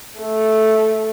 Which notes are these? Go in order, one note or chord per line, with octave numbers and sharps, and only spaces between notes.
A3